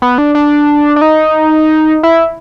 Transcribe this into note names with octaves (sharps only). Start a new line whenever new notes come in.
B3
D4
D4
D4
D#4
E4